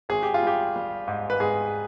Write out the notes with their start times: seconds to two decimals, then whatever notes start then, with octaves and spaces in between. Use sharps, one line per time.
0.09 G#1 G#4
0.23 G4
0.34 F4
0.43 G3 G4
0.76 G3
1.08 G#2
1.30 B4
1.40 G#2 G#4